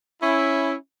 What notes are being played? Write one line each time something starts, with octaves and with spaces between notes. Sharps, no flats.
C#4 E4